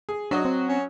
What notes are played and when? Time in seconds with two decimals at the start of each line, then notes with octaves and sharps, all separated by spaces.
0.09 G#4
0.31 F#3 D4 F#4 D#5
0.45 C4
0.69 C#4